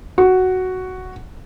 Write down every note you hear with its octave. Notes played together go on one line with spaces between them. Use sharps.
F#4